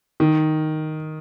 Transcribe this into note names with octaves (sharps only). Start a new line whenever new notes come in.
D#3